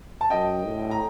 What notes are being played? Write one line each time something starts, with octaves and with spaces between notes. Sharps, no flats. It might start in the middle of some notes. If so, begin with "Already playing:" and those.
A5
F#2 D#5 G5
A2
A#5